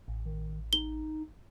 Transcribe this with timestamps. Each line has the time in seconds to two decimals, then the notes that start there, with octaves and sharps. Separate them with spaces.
0.08 A1
0.25 D#3
0.73 D#4 G7